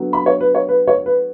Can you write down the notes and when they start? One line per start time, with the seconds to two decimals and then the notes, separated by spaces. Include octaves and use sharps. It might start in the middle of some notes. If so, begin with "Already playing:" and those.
Already playing: D3 F#3 B3
0.13 B5
0.26 C#5
0.41 B4
0.55 C#5
0.69 B4
0.88 C#5
1.06 B4